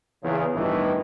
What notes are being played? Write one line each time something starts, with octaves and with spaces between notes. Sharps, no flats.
E2 C#3
G1 A2 D#3 E3